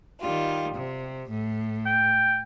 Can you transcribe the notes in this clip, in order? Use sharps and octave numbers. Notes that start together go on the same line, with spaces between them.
D#3 G3 F4
C3
A2
G5